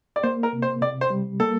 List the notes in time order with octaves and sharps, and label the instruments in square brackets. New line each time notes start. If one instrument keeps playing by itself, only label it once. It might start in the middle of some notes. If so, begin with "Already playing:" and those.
[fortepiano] D5
[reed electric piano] A#3 [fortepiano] C5
[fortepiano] A#4
[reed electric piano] C3
[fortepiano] C5
[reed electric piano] C3 [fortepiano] D5
[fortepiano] C5
[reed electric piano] G3
[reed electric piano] A#3 [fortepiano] A4